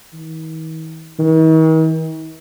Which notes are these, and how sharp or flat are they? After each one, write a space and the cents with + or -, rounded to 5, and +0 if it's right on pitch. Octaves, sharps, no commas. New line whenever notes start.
D#3 +45
D#3 +45